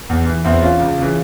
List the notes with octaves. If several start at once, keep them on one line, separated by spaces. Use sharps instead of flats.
E2
E3
E2 C4 E4
E3 C#4 F4
C#2
C#3 E3